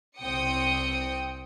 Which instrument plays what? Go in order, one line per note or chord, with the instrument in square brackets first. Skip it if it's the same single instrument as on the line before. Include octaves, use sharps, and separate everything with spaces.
[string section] C2 C4 G5 D#6 C#7